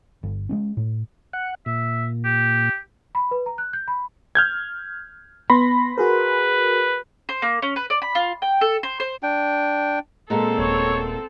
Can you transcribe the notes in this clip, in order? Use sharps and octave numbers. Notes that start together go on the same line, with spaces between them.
G1
G#3 B3 C#4
A2
F#5
A#2 E5
G4
B5
B4
A#5
F#6
G6
B5
F6 G6 G#6
B3 B4 B5 C6 A#6
F#4 G#4 A#4 B4
C5
A#3
C#4
B4
D5
B5
F4
G5
A4
C5
C5
D4 G5
A#2 G#3 B3 C4 A4
D#1 C#5